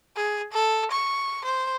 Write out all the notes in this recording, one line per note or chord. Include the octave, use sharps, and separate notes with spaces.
G#4
A4
C#6
C5